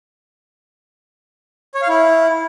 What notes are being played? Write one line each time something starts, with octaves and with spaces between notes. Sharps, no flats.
C#5
F5
E4